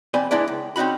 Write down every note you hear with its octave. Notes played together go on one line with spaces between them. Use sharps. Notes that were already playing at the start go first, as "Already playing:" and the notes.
F2 C4 D5 G#5 B5
G#2 E3 G#3 D4 E4 D5
C#2
C4 C#4 D#4 F#4 B5